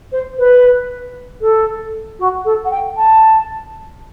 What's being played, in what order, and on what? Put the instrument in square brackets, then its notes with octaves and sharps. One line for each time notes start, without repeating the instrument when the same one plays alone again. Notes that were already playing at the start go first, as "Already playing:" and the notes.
[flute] C5
B4
A4
F#4
A4
F#5
G5
A5